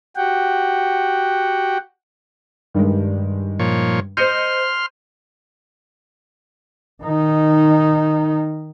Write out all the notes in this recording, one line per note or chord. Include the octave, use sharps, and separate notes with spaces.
F#4 G4 F#5 G5
G2 D#3 G3 G#3
A#2 F3 C#5
C5 D#5 C6 F6 G6 C#7 D#7
D#3 D#4